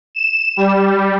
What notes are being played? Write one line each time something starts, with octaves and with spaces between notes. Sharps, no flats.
E7
G3